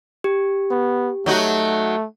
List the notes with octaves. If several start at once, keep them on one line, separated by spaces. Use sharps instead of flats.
G4
B3
F#3 A3 D#4 F#4